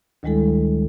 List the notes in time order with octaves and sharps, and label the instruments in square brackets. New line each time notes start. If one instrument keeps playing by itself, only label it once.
[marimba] D2 D#3 G3 G#3 E4 A4